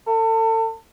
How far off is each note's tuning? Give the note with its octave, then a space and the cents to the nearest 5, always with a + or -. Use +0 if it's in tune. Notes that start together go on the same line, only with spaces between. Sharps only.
A4 +35